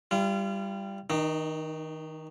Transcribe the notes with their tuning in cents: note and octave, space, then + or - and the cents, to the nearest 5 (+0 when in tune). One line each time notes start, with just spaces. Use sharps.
G3 +5 F4 -35
D#3 +25 D#4 -25